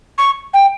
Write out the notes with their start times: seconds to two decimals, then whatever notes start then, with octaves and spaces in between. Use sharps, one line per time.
0.18 C#6
0.54 G5